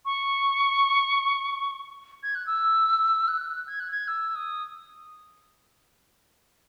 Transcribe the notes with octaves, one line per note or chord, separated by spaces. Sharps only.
C#6
G#6
F#6
E6
F#6
G#6
F#6
G#6
E6
D#6